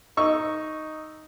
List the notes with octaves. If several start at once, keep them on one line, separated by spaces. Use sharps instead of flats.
D#4 C#6 E6